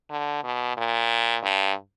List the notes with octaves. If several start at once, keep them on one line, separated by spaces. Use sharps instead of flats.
D3
B2
A#2
G2